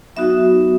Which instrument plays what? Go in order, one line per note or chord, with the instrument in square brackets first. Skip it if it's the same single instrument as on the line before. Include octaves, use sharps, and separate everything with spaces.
[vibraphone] F#3 B3 D#4 F#4 E5